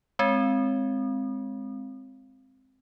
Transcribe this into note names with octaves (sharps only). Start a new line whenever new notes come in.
G#3 C4